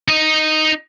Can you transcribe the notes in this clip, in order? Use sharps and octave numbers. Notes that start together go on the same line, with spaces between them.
D#4 D#5